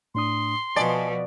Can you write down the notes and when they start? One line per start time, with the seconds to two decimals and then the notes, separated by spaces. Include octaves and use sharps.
0.15 A2 D4 C6 D#6
0.76 B2 F3 D5 D#5 G#5 A5